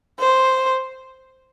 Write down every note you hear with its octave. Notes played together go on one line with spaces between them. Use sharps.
C5